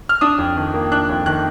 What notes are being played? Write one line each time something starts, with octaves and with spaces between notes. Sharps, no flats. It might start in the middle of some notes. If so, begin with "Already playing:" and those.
F6
D4 D#6
F2
D#3
A#3
D4 F#6
F2
D#3 F#6